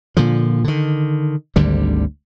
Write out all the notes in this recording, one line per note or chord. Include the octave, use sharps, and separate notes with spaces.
A#2 D3 F3
D3 D#3
G#1 D2 D3 G3